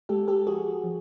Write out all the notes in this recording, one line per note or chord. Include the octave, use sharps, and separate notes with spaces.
G#3 G4 A4
G4 A4
F3 F#4 G#4
F3